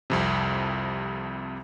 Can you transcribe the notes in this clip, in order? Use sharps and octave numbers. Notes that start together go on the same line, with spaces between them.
C2 F2 C3